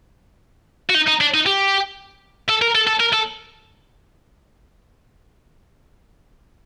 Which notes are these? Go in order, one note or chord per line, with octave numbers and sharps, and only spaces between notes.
F#4
D#4
D#4
D4
D#4
G4
A4
A#4
A4
A4
A#4
A4